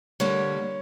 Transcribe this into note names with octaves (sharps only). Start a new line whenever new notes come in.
D3 G3 A#3 C#5